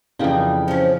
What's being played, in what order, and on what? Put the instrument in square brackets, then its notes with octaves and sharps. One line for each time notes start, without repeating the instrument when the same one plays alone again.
[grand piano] F2 F4 [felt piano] C#3 F5 G5 [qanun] E3 G3 D#4
[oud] F3 C#4